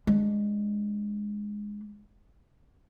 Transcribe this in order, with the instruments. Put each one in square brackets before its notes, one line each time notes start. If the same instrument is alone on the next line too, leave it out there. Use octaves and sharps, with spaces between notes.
[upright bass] G#3 D4